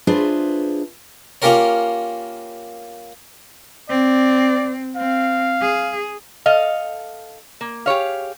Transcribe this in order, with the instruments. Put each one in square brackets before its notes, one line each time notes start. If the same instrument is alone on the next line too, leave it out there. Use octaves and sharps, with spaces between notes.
[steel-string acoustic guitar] D4 F4 G#4 B4 C5 E5
[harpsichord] A#3 C#4 F4 G4 A#4 C#5
[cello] C4 [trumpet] D5
[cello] C4 [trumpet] F5
[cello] G#4
[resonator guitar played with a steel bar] A4 D#5 F5
A#3
G4 G#4 C#5 F5